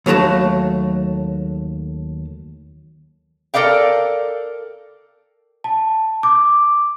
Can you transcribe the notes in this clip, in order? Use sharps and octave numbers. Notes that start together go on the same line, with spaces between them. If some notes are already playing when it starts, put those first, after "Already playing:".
D#2 F#3 A3 F#4 A5
A4 A#4 D5 F5 G5
A5
D6